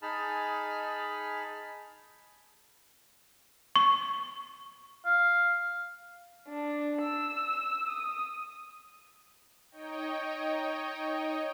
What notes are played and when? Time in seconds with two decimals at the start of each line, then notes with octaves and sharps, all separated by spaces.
0.02 D#4 G#4 A5 B5 F6
3.76 C#6
5.06 F5
6.49 D4
7.02 E6
7.87 D#6
9.71 D#4 C#5 D#5 G5